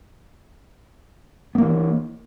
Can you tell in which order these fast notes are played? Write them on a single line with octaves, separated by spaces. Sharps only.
B3 A#3 E3